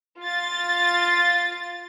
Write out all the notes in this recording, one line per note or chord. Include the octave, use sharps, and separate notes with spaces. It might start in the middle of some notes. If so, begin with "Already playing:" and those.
F4 A6